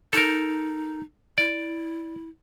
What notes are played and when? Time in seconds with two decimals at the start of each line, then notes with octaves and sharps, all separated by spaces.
0.13 D#4 A4 A#4
1.38 E4 D5